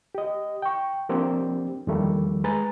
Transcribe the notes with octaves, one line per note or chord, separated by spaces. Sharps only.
G4 D#5
G5 C#6
F3 A#3 C4 D4 G4
E2 D#3 F3 G3 A3 A#3
G#3 B4 G#5 A#5 A6